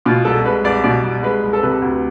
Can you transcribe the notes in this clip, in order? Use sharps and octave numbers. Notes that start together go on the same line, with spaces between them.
B2 F4
C2 A4
G#3 B4
C2 D5
B2 D5
C2
G#3 B4
C2
A4
C3 B4
D2